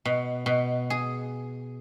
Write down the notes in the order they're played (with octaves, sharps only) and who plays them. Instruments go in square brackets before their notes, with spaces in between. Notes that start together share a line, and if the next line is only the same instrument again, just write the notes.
[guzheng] B2
B2
G#4